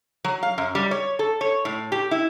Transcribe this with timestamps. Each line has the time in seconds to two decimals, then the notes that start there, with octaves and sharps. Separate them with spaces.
0.24 F#3
0.43 F5
0.58 F#2
0.75 G3
0.91 C#5
1.19 A4
1.41 C#5
1.65 A2
1.92 G4
2.11 E4